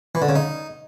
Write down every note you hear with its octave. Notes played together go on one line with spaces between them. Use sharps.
E3
D3
C#3
D#4